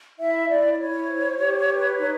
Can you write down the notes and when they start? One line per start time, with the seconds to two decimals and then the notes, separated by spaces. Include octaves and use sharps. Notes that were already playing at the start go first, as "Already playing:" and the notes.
0.19 E4 E5
0.50 E4 D5
0.73 D5
0.79 E4 C#5
1.09 C5
1.39 G4
1.69 B4
1.99 D#4